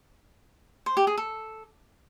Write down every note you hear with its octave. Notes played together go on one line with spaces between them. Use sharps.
C5
G4
G#4
A4